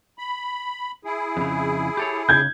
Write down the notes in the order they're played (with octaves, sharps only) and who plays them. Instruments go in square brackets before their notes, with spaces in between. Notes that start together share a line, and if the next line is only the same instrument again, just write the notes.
[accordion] B5
E4 G#4
[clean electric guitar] F2 C#3
G4 A4 C#5
[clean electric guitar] C#3 [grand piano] G6 G#6